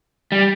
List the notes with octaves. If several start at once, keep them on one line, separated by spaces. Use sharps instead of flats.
G3